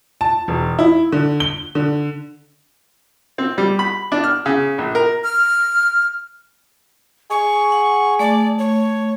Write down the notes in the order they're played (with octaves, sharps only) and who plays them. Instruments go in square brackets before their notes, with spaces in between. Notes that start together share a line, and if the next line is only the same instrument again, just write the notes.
[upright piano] A5
E1
E4
D3
G7
D3
[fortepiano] C4
G3
B5
D4
F6
C#3
A#1
A#4
[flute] F6
[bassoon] G#4 [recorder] C#6
[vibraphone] F#5
[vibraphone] A3 [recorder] D5
[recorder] C#5